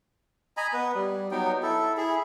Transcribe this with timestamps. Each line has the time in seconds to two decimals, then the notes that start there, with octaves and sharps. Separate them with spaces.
0.57 D#5 G#5 A#5 B5
0.73 B3 B4
0.95 G3
1.31 F#3 B3 D#4 G5
1.63 E4 A4
1.97 E4 G#4